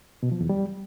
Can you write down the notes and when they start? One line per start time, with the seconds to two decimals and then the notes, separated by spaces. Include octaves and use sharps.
0.23 B2
0.32 F3
0.40 E2
0.49 G3